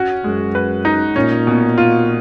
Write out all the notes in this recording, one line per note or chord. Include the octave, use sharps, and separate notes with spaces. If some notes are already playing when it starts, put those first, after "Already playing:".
Already playing: C#4 F#4
F#2 G#3
B4
D#4
A#2 C#4
B2
F4